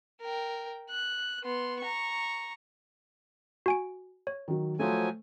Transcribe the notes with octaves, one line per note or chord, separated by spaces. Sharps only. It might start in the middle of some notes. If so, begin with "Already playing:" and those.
A#4 G5
F#6
B3 C6
A#5 C#6
F#4 G#5 D7
C#5
D#3 F#3
F3 F#3 A3 C5 G#5